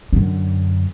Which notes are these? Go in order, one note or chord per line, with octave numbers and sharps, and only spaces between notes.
F#2 D3